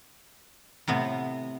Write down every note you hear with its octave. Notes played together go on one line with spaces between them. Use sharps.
A2 C3 B3